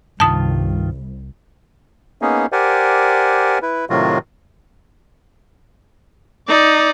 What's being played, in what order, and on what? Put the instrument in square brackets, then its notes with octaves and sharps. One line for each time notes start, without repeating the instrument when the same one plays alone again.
[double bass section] C2 [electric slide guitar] G2 D#3 F4 [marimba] A5 D#6
[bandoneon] A#3 B3 C#4 D#4 G#4
G4 A#4 C5 D5 F#5 G#5
E4 B4
A2 C3 D#3 F#3 F4 F#4
[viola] D#4 [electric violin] D5